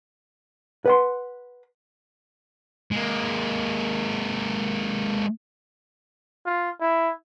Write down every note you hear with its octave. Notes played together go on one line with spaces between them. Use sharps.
B4 F#5 C6
G#3 A#3
F4
E4